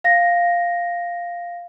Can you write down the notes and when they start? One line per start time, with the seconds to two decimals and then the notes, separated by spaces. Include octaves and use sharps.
0.04 F5 A#6